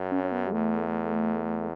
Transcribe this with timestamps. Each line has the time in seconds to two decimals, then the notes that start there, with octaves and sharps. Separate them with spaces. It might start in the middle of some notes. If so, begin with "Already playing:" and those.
Already playing: F#2
0.12 C#4
0.24 C#4
0.32 B3
0.47 G3
0.52 E2 A3